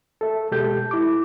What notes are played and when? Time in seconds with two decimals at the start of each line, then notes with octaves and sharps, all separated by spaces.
0.21 A4 E5
0.52 B2 G#3 G4 A4 G6
0.91 E4 D6